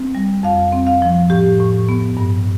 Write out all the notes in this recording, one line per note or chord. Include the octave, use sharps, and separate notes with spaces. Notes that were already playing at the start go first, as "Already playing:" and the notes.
Already playing: C4
G3
F2 F5
C4
F5
F3
A2 G4
A2
B3
G2